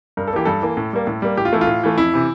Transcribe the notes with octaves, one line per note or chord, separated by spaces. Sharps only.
G2 A#4
A4
E3 A#3 G4
G2 A4
E3 A#3
A2
G3 A#3
A2
G3 A#3
A2 G4
F4
E3 A3 E4
F4
A2
E3 A3
F2 E4
C3 E3